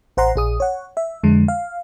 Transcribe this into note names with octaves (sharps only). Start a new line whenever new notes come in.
A1 C5 F#5 A#5 C6
A#1 G#4 D#6
C#5 F#5
E5
F2 D3 G#3
F5